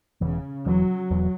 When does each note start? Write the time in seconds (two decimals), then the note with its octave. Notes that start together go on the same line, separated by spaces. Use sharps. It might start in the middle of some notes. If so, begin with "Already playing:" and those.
0.21 E1 E2 C#3 E3
0.66 E1 E2 E3 F#3
1.11 E1 E2 E3